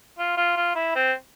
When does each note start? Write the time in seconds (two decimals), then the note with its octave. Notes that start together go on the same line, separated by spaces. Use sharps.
0.18 F4
0.37 F4
0.56 F4
0.75 E4
0.95 C4